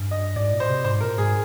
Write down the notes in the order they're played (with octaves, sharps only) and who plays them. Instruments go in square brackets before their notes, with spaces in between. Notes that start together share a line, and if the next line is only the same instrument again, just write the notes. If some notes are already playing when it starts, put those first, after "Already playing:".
Already playing: [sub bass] G2
[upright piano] D#5
[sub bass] G#2 [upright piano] D5
[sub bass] A#2
[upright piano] C5
[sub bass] C3
[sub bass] G#2 [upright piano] C5
[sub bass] A#2 [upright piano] A#4
[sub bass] G#2 [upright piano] G#4